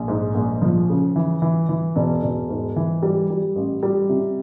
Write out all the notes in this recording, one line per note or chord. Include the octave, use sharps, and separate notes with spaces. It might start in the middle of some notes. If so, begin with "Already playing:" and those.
Already playing: A#1
G#2
A#1
F3
C#3
E3
E3
E3
E1
E1
G#2
E3
G3
G3
A1
G3
C3